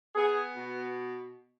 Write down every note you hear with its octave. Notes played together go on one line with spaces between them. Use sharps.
B3 G#4
B2